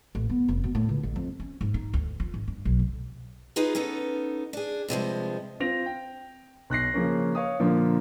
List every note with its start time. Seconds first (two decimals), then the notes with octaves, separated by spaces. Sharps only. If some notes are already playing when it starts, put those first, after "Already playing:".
0.15 A1
0.29 B3
0.48 F1
0.64 B2
0.75 A2
0.89 C#2
1.03 A1
1.16 F2
1.40 C#4
1.61 G#2
1.74 D#4
1.93 D2
2.20 F4
2.34 G#1
2.48 G2
2.65 B1
2.79 C3
3.56 D#4 F4 G#4 B4
3.75 B3 C#4 D#4 A4
4.53 D4 G#4
4.88 G2 C3 F3 G#3
5.60 C4 F4 A#6 F7
5.86 G5
6.70 B1 F#6 A#6 C7
6.94 C#3 F3 A#3 C#4
7.35 C#5 F5 D#6
7.60 A#2 D3 F3 A#3